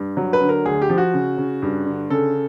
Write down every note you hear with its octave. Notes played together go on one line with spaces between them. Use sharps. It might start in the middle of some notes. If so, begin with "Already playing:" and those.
Already playing: G2
F#3
B4
D3
A#4
D2 G#4
G4
F3
F#4
C#3
C#3
G2
D3
C#3 A4